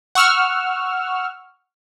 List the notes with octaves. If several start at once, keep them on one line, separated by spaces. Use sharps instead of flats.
F#5 C#6 E6 F6